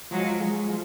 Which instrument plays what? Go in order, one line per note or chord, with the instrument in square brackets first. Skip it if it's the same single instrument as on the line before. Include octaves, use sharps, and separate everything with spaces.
[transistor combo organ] F3 [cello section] F#3 G#3
[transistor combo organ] G#3
F3